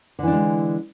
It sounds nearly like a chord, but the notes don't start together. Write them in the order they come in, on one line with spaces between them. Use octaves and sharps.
D3 E3 D4 G#3